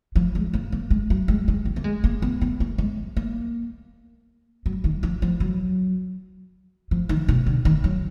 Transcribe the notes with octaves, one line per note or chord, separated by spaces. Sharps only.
F3
G#3
A#3
A#3
G#3
F#3
G#3
G#3
F#3
A#3
G#3
A#3
B3
B3
A#3
G#3
A#3
F#3
D#3
F3
F3
F#3
F3
D#3
B2
D3
D#3
F#3